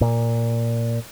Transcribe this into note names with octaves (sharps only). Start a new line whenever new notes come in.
A#2